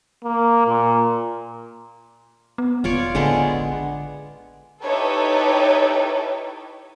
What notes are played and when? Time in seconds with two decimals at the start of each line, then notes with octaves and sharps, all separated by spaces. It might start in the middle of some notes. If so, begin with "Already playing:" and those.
0.24 A#3
0.67 A#2
2.58 B3
2.84 E1 F4 C#5 D5
3.15 A1 D3 G#3 B3
4.83 D#4 E4 G4 A4 B4 C#5